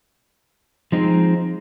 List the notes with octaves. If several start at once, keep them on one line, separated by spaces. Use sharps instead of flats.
F3 G#3 C4 D#4